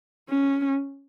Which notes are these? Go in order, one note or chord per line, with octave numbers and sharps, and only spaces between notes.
C#4